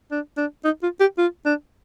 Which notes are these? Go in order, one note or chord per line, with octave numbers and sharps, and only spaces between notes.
D4
D4
D#4
F4
G4
F4
D4